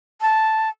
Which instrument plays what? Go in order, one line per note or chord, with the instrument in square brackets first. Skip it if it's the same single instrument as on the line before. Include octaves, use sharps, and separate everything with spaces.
[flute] A5